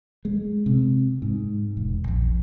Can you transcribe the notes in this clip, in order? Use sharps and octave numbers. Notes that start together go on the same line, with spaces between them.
G#3
C3
G#2
E1
A#1